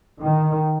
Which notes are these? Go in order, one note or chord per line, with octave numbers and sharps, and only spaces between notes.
D#3